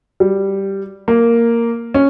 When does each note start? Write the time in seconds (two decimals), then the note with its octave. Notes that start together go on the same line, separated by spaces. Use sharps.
0.20 G3
1.08 A#3
1.94 C#4